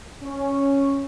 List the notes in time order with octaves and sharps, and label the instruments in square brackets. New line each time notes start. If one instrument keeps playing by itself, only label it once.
[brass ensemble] C#4